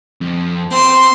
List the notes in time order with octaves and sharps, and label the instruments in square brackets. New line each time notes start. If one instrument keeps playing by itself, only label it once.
[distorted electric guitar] F2
[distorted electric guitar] C4 [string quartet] C6